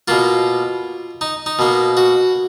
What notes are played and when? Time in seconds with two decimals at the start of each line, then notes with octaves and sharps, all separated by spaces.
0.08 B2 A#3 F4
1.21 D#4
1.46 D#4
1.59 B2 A#3
1.97 F#4